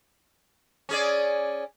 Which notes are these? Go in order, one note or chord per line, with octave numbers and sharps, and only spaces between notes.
C#4 G#4 D5